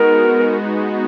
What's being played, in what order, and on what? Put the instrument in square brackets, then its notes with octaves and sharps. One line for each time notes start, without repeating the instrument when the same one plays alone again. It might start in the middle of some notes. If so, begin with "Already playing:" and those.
Already playing: [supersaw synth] G#3 B3 D#4 F#4 [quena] A#4